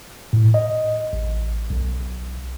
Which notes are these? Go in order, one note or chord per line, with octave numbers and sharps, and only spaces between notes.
A2
D#5
A1
B1